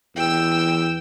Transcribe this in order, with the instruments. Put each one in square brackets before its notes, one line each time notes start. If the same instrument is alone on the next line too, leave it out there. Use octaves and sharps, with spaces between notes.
[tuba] E2 [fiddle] G5 E6